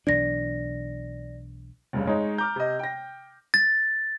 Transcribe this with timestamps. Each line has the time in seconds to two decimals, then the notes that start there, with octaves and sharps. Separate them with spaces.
0.07 B1 E3 D4 D5 A#6
1.93 F1 G2 C#3
2.07 G#3 D#4 C#5
2.38 A#5 D6 F6 G6
2.56 C3 D#5
2.79 G5 A#6
3.54 A6